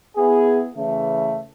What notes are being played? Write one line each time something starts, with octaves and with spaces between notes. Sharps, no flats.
B3 E4 G#4
C#3 E3 A3